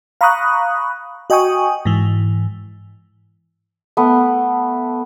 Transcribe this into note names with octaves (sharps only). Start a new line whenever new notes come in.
F5 A#5 B5 C#6 D#6 F#6
F#4 D#5 G5 G#5 C#6 D#6
G#2 E3
A3 B3